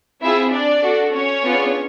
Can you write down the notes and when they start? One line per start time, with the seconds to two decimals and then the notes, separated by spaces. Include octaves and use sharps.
0.22 C4 E4 F4 G#4 E5
0.52 D4 D5
0.82 D4 F#4 A4
1.13 C#4 C#5
1.44 B3 D4 F4 G#4